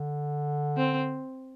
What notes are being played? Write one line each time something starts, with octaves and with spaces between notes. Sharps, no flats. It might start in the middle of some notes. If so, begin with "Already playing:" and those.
Already playing: D3
C4